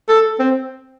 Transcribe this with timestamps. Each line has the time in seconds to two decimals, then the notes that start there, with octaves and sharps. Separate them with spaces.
0.09 A4
0.39 C4